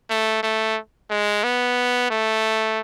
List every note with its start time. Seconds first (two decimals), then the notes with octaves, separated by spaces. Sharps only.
0.10 A3
0.43 A3
1.10 G#3
1.44 B3
2.10 A3